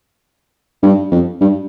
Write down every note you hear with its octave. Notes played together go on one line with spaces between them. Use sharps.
G2
F2
G2